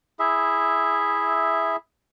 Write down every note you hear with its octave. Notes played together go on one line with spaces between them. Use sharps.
E4 G#4 E5